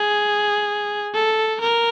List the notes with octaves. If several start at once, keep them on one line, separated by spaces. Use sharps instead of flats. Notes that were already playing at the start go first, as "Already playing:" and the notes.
Already playing: G#4
A4
A#4